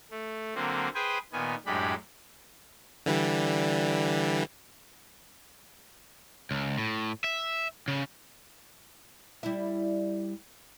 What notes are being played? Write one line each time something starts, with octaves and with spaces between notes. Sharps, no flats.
A3
D3 F#3 A#3 C4
G#4 B4 C5 G5 G#5
A#2 D#3 B3 G#5
F#2 A2 G#3 D4 G4 B5
D3 E3 G3
C#2
A2
E5
C#3
G3 E4